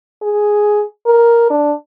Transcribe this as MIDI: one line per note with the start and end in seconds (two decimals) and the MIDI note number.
0.22 0.83 68
1.06 1.48 70
1.50 1.72 62